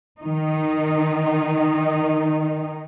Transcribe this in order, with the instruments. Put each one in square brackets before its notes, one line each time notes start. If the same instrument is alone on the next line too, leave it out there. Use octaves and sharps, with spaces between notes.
[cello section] D#3 D#4